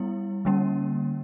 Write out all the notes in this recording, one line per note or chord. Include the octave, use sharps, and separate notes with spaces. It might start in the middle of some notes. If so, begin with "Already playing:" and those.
Already playing: G3 B3 E4
D3 G3 A#3 C#4